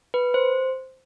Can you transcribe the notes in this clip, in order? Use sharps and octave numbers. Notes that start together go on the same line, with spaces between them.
B4
C5